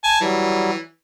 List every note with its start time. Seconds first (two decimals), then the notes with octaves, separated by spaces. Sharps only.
0.04 G#5 A5
0.21 E3 F#3 G3